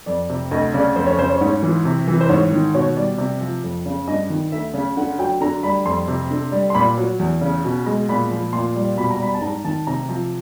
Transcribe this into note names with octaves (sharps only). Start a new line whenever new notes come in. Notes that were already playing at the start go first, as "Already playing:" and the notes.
F2 D5
C3
D2 D#5
C#3 D5
F2 C5
C#5
C#3 C5
C#5
G#2 C#5
E3
C3
E3
C5
G#2 C#5
D#3
B2 C#5
G3 D5
C3
F3
F2
C#3
G2 D#5
D#3
D2 E5
C#3
D3 F#5
F#3 G5
D3 A#5
G3 B5
F2 C6
C3
D3
G3
C6
A#2 B5
F#3
E2
C#3
B2
G#3
A#2 B5
F3
A#2 C6
G3
B2 B5
A#5
G3 B5
A5
G#2 A#5
D#3 A5
C3 A#5
F3